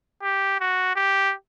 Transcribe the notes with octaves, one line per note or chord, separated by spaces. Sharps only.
G4
F#4
G4